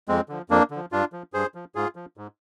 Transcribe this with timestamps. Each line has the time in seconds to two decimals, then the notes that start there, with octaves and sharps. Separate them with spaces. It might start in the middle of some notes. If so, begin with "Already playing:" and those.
0.08 F2 G#3 C4
0.29 D3 F3
0.50 F2 A#3 D4
0.71 D3 F3
0.92 G2 D4 F4
1.13 F3
1.33 G2 G#4 C5
1.55 F3
1.75 G#2 F4 G#4
1.96 F3
2.17 G#2